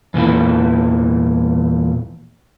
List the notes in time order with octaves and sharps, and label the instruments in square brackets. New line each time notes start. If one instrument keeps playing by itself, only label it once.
[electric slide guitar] E2 A#2 D3 E3